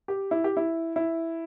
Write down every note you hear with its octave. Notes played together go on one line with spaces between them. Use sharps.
G4
E4
G4
E4
E4